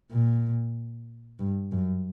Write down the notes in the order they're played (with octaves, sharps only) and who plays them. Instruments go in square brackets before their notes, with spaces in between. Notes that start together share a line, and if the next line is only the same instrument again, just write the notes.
[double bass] A#2
G2
F#2